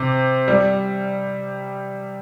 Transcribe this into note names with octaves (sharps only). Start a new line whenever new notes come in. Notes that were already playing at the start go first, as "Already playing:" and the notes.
Already playing: C3
G3